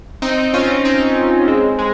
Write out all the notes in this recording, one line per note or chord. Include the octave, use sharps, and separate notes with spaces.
C4 D#4
C#4 F4
C4 D#4
G#3 C4
G#3